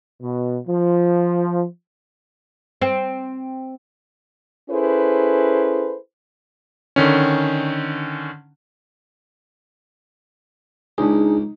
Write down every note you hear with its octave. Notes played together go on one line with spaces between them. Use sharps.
B2
F3
C4
C#4 E4 G#4 A4 B4 C5
D3 D#3 C#4
C#2 D4 D#4 G#4